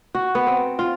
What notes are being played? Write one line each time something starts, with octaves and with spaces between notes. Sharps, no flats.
F#4
B3
C4
F4